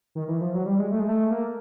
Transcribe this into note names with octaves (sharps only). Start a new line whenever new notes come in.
D#3
E3
F3
F#3
G3
G#3
A3
G#3
A3
A#3